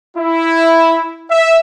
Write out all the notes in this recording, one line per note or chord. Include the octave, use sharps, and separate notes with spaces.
E4
E5